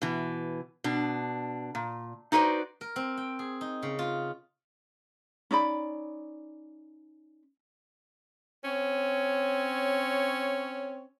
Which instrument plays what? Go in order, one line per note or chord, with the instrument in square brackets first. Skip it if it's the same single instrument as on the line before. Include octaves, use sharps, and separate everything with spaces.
[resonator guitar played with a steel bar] B2 E3
B2 D4
A#2
D#4 F#4 B4 C5 D5
[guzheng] A#4
C4
G5
G#4
D#4
C#3
F4
[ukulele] C#4 D#4 D5 B5
[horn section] C4 C#4 C#5